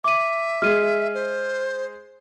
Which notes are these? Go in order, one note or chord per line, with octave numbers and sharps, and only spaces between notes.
E5 D6 D#7
G#3 G#4 F6 D#7
C5